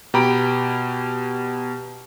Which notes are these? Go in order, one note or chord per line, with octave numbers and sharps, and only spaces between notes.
B2 G4 G5 A#5 B5 D7